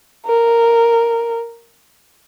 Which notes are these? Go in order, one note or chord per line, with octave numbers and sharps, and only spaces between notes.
A#4